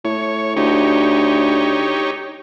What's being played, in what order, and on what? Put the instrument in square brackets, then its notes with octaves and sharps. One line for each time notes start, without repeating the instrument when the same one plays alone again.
[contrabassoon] A2 [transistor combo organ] C#5
[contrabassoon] D2 [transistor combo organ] D#4 G4 C#5